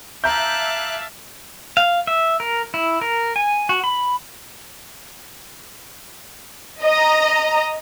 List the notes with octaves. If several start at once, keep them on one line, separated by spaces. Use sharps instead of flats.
E5 F5 A5 A#5 D6 F#6 G6
F5
E5
A#4
E4
A#4
G#5
F#4
B5
D#5 A#5